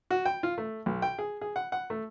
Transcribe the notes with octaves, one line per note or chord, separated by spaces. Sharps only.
F#4
G5
F4
A3
B1
G5
G#4
G#4
F#5
F#5
A3